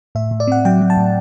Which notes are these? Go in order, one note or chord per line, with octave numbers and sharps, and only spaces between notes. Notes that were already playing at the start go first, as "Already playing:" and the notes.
A2 E5
A2
D5
C4 F#5
F#3 G5
F#3
A5
A2